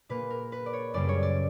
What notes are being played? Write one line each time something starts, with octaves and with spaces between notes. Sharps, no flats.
A#2 A#3 B4
A#4
B4
D5
C#5
F#2 C#3 G3 A#3 D5
C#5
D5